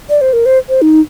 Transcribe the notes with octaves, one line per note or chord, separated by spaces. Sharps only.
D5
C5
A#4
C5
C5
D#4